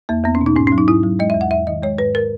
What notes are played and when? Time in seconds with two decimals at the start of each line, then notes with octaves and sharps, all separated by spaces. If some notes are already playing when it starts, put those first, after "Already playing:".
0.09 E2 A#3
0.24 E2 B3
0.35 C#4
0.41 B2
0.46 D#4
0.56 G#2 C#4
0.67 C#4
0.72 F#3
0.78 D#4
0.87 G#2 E4
1.04 F#3
1.19 G#3 D#5
1.30 E5
1.35 E2
1.41 F#5
1.51 E2 E5
1.67 D#3 D#5
1.83 G#3 C#5
1.98 G#2 B4
2.15 A#4